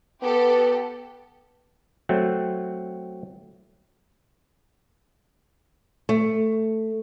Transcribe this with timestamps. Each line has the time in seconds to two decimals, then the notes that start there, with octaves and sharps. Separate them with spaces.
0.23 B3 G4 A4
2.09 F#3 A3 C4
6.09 A3